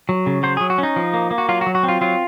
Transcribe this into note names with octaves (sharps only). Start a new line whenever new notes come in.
F#3
C#3
F#3 C5
F#3 G#4
F#4
C#4
D#4
F3
A#3
A#3
F#4
F#3 F4
F#4
F#3
F#4
C4
F4
F#3 F4